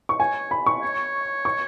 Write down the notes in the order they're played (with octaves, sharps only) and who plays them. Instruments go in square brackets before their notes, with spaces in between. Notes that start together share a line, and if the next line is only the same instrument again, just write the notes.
[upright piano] C#6
[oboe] C#5 [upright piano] G#5
[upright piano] B5
C#6
[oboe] C#5
[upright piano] C#6